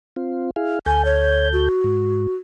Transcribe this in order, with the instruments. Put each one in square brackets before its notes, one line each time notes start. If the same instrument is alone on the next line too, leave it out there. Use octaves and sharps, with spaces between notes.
[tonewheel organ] C4 F4
E4 G#4 F5
[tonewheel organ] D2 A4 G6 [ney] G#5
[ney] C#5
F#4
[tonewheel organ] G#2